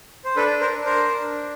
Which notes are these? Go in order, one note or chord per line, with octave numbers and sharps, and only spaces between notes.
C5
D4 A4 B4
A#4 C5
D4
A#4 C5
D4